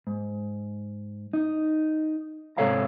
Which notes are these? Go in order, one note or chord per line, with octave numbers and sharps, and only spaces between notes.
G#2
D#4
G#2 C3 A4 C#5 F5 A#5